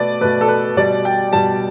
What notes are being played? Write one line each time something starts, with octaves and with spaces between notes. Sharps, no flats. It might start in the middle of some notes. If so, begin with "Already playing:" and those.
Already playing: B2 A3 B4 D5
B2 A3 B4
A4
B4
B2 G3 D5
G5
B2 G3 A5